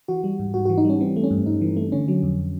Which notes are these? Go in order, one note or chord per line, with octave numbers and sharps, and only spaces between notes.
E3 F#4
G3
G#2
G#2 F#4
F#4
E3
D#4
G3 C#4
E3 C4
A3
C#4
G2
G2 D#4
E3
A3
D3 C#4
F#3
F2